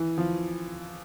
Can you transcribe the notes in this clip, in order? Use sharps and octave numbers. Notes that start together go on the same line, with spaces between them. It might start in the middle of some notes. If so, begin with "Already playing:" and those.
Already playing: E3
F3